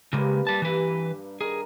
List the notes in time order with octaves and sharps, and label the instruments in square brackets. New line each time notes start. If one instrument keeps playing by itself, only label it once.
[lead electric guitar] C#3 G#3 [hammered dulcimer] G3 A#3 B4
[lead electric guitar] G3 A5
[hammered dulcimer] G2 [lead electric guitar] E3 B4
[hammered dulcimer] D#3 A#4 [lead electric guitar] G#4